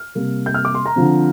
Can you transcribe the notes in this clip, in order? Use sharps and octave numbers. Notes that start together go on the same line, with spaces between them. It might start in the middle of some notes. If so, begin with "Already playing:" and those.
Already playing: F6
C3 G3 A#3
G6
F6
D6
C6
A#5
D3 F3 C4